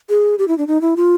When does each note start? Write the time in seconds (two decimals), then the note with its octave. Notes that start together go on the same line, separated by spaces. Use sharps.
0.09 G#4
0.39 G4
0.48 E4
0.58 D4
0.67 D#4
0.82 E4
0.97 F4